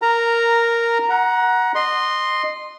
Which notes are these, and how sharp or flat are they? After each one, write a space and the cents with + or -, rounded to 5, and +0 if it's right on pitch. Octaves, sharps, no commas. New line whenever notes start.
A#4 +0 A#5 -10
F#5 +0 A#5 +25
D#5 -20 C6 +0